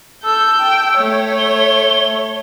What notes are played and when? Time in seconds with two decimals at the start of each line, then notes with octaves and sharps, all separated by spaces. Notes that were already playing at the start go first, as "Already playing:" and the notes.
0.24 A4 E6 G6
0.60 G5
0.97 A3 C#5
1.38 G7